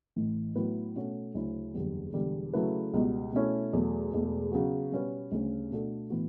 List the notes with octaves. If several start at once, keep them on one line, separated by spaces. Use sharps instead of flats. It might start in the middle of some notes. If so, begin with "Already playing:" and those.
A1 A2 E3
A2 F#3 B3 E4 B4
B2 A3 C#4 F#4
D2 C#3 F#3 C#4 E4
F#1 E2 D3 G3 B3
E1 E2 D3 G3
C#3 F#3 A3 E4 B4
C#2 B2 G3 B3
B2 A3 C#4 E4
E2 B2 F#3 A3
E1 E2 B2 A3
C#3 F#3 B3 F#4
B2 G3 C#4 F#4 B4
D2 C#3 G3 C#4 G4
B2 A3 D4 F#4 A4
A2 E3 B3 F#4